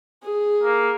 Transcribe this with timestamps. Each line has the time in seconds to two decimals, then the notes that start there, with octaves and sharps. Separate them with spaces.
0.23 G#4
0.63 A#3